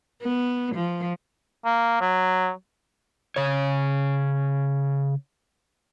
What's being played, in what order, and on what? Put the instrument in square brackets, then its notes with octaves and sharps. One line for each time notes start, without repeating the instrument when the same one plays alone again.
[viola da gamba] B3
F3
[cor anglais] A#3
F#3
[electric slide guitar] C#3 C#5